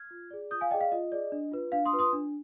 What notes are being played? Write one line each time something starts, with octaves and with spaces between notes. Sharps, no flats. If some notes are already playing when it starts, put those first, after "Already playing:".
Already playing: F6 G#6
F4
G#4 D5
F4 D#6 G6
F5 G#5
G#4 D5 D#5 G5
F5
F4 D#5
G#4 D5
D4
F4 B4
D4 F5
C6 D#6
F4 B4
C6 D#6
D4